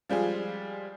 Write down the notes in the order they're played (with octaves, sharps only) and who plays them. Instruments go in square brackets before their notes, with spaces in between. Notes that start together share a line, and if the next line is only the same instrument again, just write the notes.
[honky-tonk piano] F3 G3 G#3 G#4